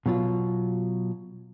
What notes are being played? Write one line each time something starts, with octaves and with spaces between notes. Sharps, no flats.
B2 F#3 F4